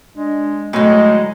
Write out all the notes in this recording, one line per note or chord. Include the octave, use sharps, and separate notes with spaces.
G#3 D4
A2 D3 F#3 G#3 D#4